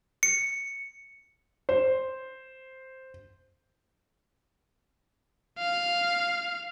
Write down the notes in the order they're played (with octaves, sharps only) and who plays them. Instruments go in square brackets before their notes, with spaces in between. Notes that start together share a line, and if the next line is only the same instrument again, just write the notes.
[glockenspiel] C#7
[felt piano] C5
[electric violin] F5